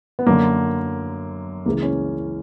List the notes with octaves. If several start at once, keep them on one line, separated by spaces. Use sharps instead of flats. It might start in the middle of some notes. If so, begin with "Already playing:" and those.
B3
F#2 D3 A#3
C#2 C#3 E3 A#3
C#4